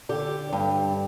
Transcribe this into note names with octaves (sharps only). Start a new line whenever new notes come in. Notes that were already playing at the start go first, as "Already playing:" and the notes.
D3 G4
G2